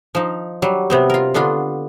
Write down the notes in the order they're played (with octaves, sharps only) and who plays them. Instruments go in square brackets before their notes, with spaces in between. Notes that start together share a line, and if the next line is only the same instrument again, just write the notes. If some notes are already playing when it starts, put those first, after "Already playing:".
[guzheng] F3 D#4
F#3 G3
C3 B3 C4
F4 A#4
D3 B3 D4 F4 B5